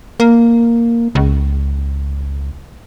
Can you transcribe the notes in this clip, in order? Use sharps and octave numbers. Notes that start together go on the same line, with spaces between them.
A#3
C#2